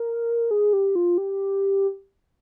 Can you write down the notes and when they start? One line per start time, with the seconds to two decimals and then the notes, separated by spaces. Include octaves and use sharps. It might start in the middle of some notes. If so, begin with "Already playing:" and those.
Already playing: A#4
0.51 G#4
0.73 G4
0.95 F4
1.18 G4